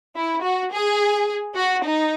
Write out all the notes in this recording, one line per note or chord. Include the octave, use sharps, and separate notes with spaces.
E4
F#4
G#4
F#4
D#4